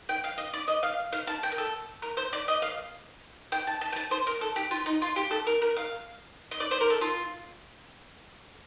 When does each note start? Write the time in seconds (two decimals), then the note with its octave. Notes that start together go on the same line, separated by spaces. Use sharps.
0.09 G5
0.24 F5
0.38 D#5
0.54 D5
0.68 D#5
0.83 F5
1.13 F5
1.27 A5
1.43 G5
1.52 A#4
1.58 A4
2.02 A#4
2.17 C5
2.33 D5
2.48 D#5
2.62 F5
3.52 G5
3.67 A5
3.81 A5
3.93 G5
3.96 A5
4.11 C5
4.27 A#4
4.41 A4
4.56 G4
4.71 F4
4.86 D#4
5.02 F4
5.16 G4
5.31 A4
5.47 A#4
5.62 A#4
5.77 F5
6.51 D#5
6.60 D5
6.71 C5
6.81 A#4
6.90 A4
7.01 F4